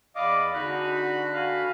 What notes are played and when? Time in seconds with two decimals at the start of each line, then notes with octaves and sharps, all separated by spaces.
0.16 E2 D5 D#5 F5 B5 D6
0.54 D3 D#4 F#4 G#4 B5 F#6
1.31 F5 G#5